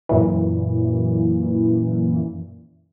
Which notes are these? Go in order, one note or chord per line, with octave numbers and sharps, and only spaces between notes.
F#2 A#2 E3